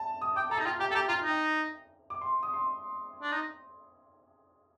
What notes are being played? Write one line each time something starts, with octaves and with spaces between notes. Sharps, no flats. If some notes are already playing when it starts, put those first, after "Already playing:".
Already playing: A5
D#6
G5 D6
A4 A#5
D#4
F4 G5
G4 G5
A4
G4 A#5
F4 A#5
D#4
D6
C6
D#6
C6
D4
D#4